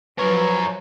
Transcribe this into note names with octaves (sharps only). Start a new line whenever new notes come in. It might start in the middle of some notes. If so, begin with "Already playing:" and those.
F3 F#3 A#4 B4 C#5